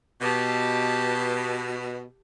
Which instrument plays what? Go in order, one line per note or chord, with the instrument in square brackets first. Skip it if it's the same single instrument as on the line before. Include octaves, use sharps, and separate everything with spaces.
[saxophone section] B2 [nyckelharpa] G4 A5